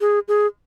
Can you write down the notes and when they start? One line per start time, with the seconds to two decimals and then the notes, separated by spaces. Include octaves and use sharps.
0.01 G#4
0.28 G#4